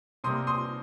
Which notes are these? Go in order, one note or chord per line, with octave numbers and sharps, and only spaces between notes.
C3 G3 A#3 C6 D#6
C6 D#6